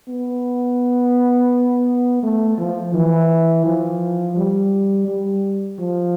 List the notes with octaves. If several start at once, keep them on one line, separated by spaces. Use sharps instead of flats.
B3
A3
F3
E3
F3
G3
G3
F3